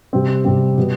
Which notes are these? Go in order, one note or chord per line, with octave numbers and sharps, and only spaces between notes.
C3 G3 C4
C3 G3 C4
B2 G3 B3